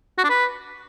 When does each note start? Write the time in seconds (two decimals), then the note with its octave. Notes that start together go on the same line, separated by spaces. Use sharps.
0.18 F#4
0.24 D4
0.30 B4